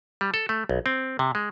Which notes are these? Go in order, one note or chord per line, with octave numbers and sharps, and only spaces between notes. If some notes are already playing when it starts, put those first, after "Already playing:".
G3
A4
A3
B1
C4
C3
G#3